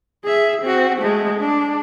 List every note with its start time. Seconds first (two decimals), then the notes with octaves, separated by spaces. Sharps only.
0.24 G#4 E5
0.62 C4 F#4
0.99 G#3 A3
1.40 D4